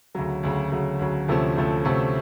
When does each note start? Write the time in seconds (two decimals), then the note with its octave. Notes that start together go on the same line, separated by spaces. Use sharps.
0.15 D2 C#3 F#3
0.43 D2 C#3 F#3
0.71 D2 C#3 F#3
0.99 D2 C#3 F#3
1.28 D2 C3 F3 A3 C#4
1.56 D2 C3 F3 A3 C#4
1.85 D2 C3 F3 A3 C#4